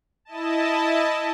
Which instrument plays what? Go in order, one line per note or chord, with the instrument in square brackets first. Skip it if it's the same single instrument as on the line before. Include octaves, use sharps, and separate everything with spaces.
[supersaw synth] E4 D#5 A5